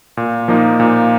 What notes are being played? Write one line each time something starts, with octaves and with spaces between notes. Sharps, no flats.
A#2
F3 A#3 D#4
A#2